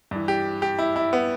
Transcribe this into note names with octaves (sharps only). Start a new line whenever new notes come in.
G2 E3
G4
G4
E4
E4
B3